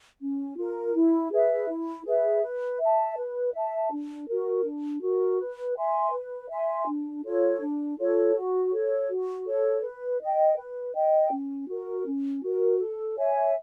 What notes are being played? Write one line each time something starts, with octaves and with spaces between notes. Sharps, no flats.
C#4
F4 A#4
E4
G#4 B4 E5
E4
G#4 B4 E5
B4
E5 A5
B4
E5 A5
D4
F#4 A#4
D4
F#4 A#4
B4
E5 G#5 C6
B4
E5 G#5 C6
D4
F4 A4 C#5
D4
F4 A4 C#5
F#4
A4 C#5
F#4
A4 C#5
B4
D#5 G5
B4
D#5 G5
C#4
F#4 A#4
C#4
F#4 A#4
A4
C#5 E5 G#5